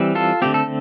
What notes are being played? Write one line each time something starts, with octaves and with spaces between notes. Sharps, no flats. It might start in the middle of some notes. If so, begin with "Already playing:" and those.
Already playing: E3 G3 C4
F4 A4
D3 A3 C4 G4
A4